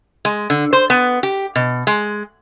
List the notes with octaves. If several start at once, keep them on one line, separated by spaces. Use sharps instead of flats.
G#3
D3
C5
B3
G4
B2
G#3